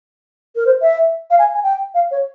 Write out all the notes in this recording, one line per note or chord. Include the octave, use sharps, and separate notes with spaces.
A#4
C5
E5
F5
G#5
G#5
G5
F5
C#5